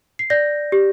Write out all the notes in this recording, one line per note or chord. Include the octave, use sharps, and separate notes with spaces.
C7
D5 G6 A#6
G4